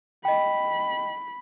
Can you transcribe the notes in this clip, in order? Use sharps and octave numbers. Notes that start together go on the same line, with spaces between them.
D#5 G5 B5